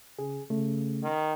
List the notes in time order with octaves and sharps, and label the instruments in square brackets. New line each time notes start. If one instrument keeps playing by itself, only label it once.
[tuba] C#3 [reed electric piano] G#4
[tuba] C#3 [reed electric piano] A3
[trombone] D#3